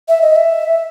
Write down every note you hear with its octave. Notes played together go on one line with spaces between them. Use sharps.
E5
D#5
E5